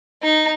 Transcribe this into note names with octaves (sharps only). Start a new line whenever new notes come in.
D#4